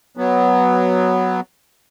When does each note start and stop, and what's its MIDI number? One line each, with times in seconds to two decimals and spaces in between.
0.17 1.40 54
0.17 1.40 59